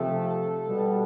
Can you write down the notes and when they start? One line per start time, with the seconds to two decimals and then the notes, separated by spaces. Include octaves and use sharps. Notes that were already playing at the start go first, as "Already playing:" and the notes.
Already playing: C3 F3 A3 A4
0.67 B2 G3 B3